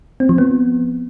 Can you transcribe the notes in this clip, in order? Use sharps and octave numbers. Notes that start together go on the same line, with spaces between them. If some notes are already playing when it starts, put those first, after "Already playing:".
C4
F3
B3